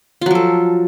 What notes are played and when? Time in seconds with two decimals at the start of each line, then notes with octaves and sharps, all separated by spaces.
0.21 F4
0.26 F#3
0.31 F3
0.35 A4